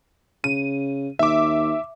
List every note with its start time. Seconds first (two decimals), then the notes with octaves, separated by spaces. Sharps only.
0.44 C#3 D#7
1.19 D#2 E5 D6